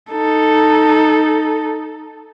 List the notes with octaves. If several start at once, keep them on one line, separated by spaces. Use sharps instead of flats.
D#4 A4